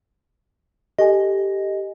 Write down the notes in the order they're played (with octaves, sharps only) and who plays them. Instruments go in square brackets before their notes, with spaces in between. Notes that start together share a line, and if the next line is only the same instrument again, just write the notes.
[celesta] G4 A4 G#5 [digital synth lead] D#5